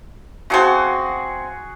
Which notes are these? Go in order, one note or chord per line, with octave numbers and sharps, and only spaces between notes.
F3 A3 C4 F#4 G#4 F#5